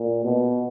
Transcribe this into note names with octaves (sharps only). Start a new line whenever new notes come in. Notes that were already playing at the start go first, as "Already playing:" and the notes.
Already playing: A#2
B2